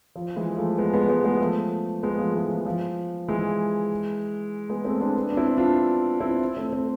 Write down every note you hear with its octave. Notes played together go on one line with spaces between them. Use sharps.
F3
E3 G#3
F3 A3
G#3 B3
G#3 B3
G#3 B3
G#3 B3
F3 A3
G#3 B3
F3 A3
E3 G#3
F3
F3
E3 G#3
G#3 B3
A3 C4
B3 D4
B3 D4
D4
C4 E4
D4 F4
C4 E4
A3 C4
A3 C4